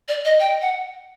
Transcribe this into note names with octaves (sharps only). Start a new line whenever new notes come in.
D5
D#5
G5
F#5